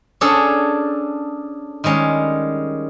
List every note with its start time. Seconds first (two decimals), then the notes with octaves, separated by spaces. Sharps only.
0.21 C#4 D4 G#4 A4 C#5
1.84 D#3 G3 G#3 C#4